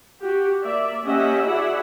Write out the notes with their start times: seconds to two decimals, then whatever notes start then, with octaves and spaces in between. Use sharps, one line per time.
0.21 F#4 G4
0.61 A#3 D5 E5
1.04 A#3 C#4 G4 D#5 E5 F#5
1.48 E4 F#4 G#4 D5 E5 F#5